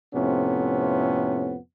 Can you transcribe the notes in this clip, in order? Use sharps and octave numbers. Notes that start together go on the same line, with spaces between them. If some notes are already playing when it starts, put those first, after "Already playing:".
F2 A2 C3 B3 C#4